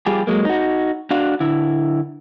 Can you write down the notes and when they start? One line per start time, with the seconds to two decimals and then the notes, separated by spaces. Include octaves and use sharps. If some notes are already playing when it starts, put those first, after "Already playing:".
0.06 G3 F4 G4 G#4
0.27 F#3 G#3 A#3
0.45 D#4 F#4
1.11 D4 F#4 F5
1.40 D3 E4